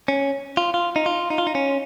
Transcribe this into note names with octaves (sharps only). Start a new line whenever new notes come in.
C#4
F4
F4
D#4
F4
D#4
F4
D#4
C#4